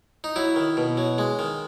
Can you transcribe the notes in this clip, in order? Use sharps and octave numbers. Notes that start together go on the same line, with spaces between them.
D#4
F#3 E4
D#3
B2
F#3
G#3
D#3